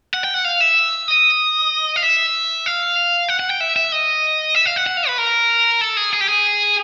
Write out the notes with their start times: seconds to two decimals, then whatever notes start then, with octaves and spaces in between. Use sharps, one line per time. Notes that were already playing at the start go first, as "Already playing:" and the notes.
0.14 F#5
0.24 G5
0.34 F#5
0.45 F5
0.61 E5
1.08 D#5
1.96 F5
2.03 E5
2.66 F5
3.29 F#5
3.40 F#5
3.50 G5
3.60 E5
3.76 E5
3.92 D#5
4.55 E5
4.66 F5
4.76 F#5
4.87 F#5
4.97 F5
5.08 B4
5.18 A#4
5.81 A4
5.97 G#4
6.13 G#4
6.21 G4
6.28 G#4